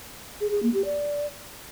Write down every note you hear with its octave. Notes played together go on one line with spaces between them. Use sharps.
G#4
G#4
A#3
G4
D5